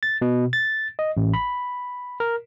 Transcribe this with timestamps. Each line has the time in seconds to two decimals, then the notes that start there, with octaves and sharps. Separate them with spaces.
0.03 A6
0.22 B2
0.53 A6
0.99 D#5
1.17 A1
1.34 B5
2.20 A#4